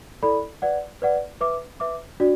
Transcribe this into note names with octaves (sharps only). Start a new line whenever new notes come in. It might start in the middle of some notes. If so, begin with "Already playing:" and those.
E4 A4 D5 B5
B4 D5 F#5
B4 D5 F#5
B4 E5 D6
B4 E5 D6
D4 F#4 D5